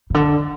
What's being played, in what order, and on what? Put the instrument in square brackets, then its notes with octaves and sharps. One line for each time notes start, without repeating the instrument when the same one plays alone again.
[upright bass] C#3
D3